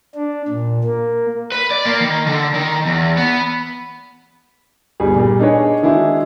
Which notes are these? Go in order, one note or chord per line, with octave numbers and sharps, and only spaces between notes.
D4
A#2
A#3
B4
D5
A#3
D#3
D3
D#3
E2
B3
G1 G3 G#4
A#2 G3
D4 D#4 G#4 B4 C#5 D#5
D#3 G#3 D4 E4 F#4 G#4